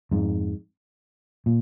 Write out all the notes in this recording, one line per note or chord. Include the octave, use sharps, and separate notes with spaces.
F2 G#2
A#2